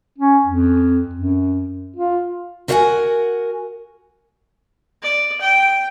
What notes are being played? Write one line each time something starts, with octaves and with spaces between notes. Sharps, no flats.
C#4
F2
F#2
F4
F#4 A#4 C5 F5 F#5 G#5
D5
G5